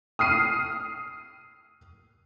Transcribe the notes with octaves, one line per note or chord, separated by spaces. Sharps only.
D#6 F6 C7 D#7